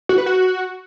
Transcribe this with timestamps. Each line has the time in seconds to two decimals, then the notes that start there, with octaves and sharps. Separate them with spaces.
0.09 F#4
0.18 B4
0.26 F#4